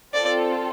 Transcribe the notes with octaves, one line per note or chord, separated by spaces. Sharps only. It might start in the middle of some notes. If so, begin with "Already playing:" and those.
C4 F4 A4 D5